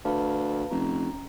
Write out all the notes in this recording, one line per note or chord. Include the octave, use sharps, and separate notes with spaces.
D2 B4 F5 A5
F1 C#4 A#5